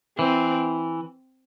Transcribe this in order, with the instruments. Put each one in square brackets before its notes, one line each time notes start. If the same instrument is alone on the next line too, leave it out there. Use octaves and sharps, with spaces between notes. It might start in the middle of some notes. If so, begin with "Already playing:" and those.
[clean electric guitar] E3 [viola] C4